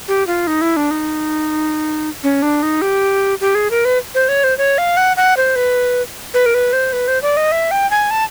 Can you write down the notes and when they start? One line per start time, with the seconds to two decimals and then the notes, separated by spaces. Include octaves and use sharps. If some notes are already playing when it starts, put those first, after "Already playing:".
0.08 G4
0.27 F4
0.47 D#4
0.61 E4
0.77 D4
0.91 D#4
2.24 C#4
2.42 D4
2.63 D#4
2.82 G4
3.41 G4
3.55 G#4
3.71 A#4
3.85 B4
4.15 C5
4.28 C#5
4.44 C5
4.58 C#5
4.78 F5
4.97 F#5
5.17 F#5
5.37 C5
5.56 B4
6.34 B4
6.46 A#4
6.54 B4
6.73 C5
6.93 B4
7.08 C5
7.22 D5
7.37 D#5
7.52 E5
7.71 G5
7.91 G#5
8.11 A5